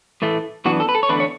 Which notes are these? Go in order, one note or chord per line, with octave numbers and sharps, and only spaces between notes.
A2 E3 A3
F#2 E3 B3 D4 F#4
A4
B4
A4
C#5
E2 D3 A3 D4 B4
C#5